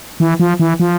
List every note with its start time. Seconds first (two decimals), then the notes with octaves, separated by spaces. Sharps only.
0.20 E3
0.40 F3
0.60 E3
0.80 F3